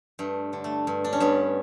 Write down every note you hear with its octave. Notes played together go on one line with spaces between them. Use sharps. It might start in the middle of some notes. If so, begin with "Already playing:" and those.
G2 A3
D3
A3
G2
D4
C#4
G2 B3